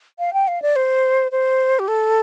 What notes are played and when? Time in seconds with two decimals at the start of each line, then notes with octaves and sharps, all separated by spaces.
0.19 F5
0.33 G5
0.48 F5
0.62 D5
0.76 C5
1.32 C5
1.79 G4
1.88 A4